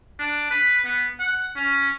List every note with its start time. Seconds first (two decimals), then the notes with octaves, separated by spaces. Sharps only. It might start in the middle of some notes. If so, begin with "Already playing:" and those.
0.19 D4
0.51 B4
0.85 B3
1.19 F#5
1.56 C#4